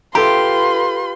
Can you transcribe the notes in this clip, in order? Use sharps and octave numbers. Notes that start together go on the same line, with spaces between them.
F4 G4 A4 B4 A#5 C6